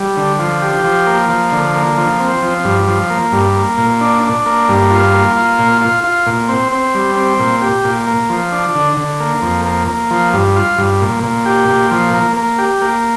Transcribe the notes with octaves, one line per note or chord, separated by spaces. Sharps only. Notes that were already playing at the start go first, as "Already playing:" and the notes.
Already playing: G3
D3
F3
G4
F3
A#3
F3
D3
A#3
F3
C4
F3
G2
F3
A#3
G2
A#3
A#2
D4
D4
A#3
G2
F4
A#3
F4
A#2
F4
F4
A#2
C4
C4
G3
C4
A#2
G4
A#2
A#3
F3
D4
D3
D3
A#3
F2
A#3
A#3
F3
G2
F4
G2
A#2
A#2
G4
A#2
F3
A#3
A#3
G4
A#3